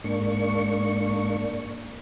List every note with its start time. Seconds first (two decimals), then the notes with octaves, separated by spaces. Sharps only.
0.04 G#2 A#3 D4 C#6